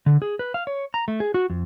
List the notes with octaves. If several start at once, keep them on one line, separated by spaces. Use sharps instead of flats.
D3
G#4
B4
F5
C#5
A#5
A3
G#4
F#4
F2